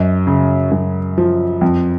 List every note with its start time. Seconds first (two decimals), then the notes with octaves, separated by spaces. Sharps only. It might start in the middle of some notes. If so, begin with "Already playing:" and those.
Already playing: F#2 D#5
0.27 C#3
0.71 F#2
1.18 F3
1.61 F2